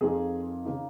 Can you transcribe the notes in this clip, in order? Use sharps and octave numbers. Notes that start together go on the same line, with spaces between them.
F2 F3 A#3 D#4 G#4
C#3 A#3 D#4